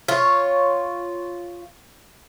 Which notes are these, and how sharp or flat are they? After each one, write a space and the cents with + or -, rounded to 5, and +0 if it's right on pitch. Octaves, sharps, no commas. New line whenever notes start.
F4 +0 C#5 +0